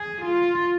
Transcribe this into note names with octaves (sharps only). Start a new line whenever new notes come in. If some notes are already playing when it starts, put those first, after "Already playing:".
Already playing: G#4
F4